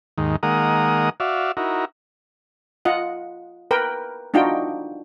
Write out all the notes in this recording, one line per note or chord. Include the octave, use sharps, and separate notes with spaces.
D#2 G#2 D#3
D#3 G#3 A#3 A#4 F#5 D#6
F#4 D5 E5 F5
D#4 E4 F#4 A#4
F4 D#5 F#5
A#4 B4 G5
D4 D#4 F4 F#4 G5